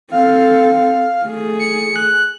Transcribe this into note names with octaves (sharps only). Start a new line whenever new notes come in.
C4 A4 F5
A3 G#4
C#7
F#6